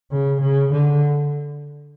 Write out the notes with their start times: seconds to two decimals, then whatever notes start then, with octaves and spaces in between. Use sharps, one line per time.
0.11 C#3
0.41 C#3
0.72 D3